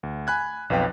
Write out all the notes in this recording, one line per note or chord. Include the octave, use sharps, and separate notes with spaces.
D2
G#5 B5 F#6 G#6
B1 F2 B4 F5 G5